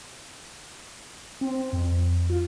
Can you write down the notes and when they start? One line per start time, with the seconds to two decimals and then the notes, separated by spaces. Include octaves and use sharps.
1.41 C4
1.73 F2
2.30 F4